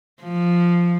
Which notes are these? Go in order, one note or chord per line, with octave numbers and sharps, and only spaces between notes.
F3